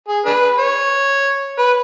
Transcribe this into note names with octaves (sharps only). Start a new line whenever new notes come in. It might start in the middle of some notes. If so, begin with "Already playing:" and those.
G#4
D4 G#4 B4
C#5
B4